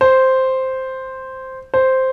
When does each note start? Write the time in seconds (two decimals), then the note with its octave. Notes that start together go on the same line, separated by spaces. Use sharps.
0.01 C5
1.74 C5